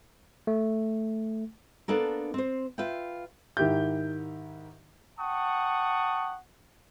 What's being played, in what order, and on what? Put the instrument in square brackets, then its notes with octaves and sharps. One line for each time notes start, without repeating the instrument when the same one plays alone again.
[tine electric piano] A3
[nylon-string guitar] A#3 B3 D4 A4 A#4
C4 C5
F4 B4 E5 G5
[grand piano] G#2 D#3 E4 G4 E5 G6
[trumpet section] F#5 G5 A5 C#6 D#6